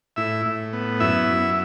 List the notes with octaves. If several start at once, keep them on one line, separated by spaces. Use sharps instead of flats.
A2 E4 E5
A2
B3
F#2 E4 E5
F#2